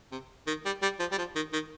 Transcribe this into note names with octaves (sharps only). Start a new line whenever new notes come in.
C3
D#3
G3
G3
F3
G3
F3
D#3
D#3